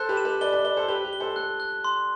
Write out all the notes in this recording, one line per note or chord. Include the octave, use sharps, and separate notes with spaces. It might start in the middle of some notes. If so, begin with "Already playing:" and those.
Already playing: A4 C5 F#6
G4 B4
E7
G4 B4
B4 D5 G7
B4 D5
B4 D5 G7
A4 C5
G4 B4 G7
G4
G7
A4 C5
A4 C5 F#6
F#6
C6